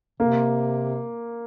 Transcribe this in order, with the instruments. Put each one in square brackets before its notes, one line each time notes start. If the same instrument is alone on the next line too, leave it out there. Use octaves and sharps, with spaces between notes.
[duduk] C3 [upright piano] A#3